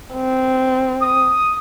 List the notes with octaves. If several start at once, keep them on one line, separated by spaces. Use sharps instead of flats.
C4
D#6